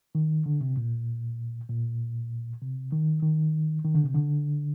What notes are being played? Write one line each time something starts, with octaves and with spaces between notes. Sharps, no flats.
D#3
D3
C3
A#2
A#2
C3
D#3
D#3
D#3
D3
C3
D3